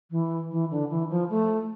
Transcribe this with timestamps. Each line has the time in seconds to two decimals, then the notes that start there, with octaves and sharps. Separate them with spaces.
0.11 E3
0.51 E3
0.71 D3
0.90 E3
1.10 F3
1.30 A3